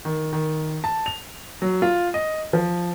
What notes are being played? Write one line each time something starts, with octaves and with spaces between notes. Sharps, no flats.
D#3
D#3
A5
F7
F#3
F4
D#5
F3